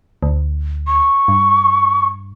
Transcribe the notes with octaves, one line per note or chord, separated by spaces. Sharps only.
D2
C#6
G2